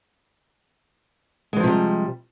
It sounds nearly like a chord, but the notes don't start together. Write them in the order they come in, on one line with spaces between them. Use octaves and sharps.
G#3 E3 F3 C3 G3